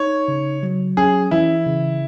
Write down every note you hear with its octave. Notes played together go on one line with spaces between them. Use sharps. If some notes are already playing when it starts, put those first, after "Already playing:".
Already playing: D#4 C#5
C#3
F#3
C#4 G#4
E3 E4
C#3